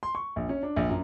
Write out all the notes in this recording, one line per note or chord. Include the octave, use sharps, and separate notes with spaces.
C6
C#6
A#1
C#4
D4
A#1
F#2